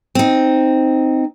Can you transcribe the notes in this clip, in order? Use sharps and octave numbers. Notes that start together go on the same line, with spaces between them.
C4 D#4